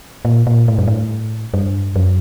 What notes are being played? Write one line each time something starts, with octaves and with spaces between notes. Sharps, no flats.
A#2
A#2
A2
G2
A2
G2
F#2